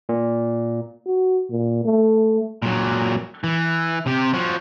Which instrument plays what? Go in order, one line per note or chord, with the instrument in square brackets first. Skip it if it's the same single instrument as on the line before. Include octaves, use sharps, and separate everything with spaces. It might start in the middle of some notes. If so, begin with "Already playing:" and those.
[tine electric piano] A#2
[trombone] F#4
A#2
A3
[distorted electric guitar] A#2 F#3
E3
C3 G4
F3 F#4